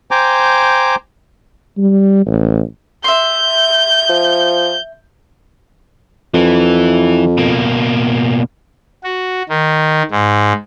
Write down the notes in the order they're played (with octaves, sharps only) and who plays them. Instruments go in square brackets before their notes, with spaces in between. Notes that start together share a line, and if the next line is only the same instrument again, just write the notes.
[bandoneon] C5 G5 G#5 A#5 D6
[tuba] G3
A1
[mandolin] E5 C6 [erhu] G6
[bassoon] F3
[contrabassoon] F2 [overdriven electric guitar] E3
[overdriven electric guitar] B2 A#3
[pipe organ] F#4
D#3
G#2